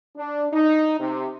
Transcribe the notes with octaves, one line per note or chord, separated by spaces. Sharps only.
D4
D#4
C3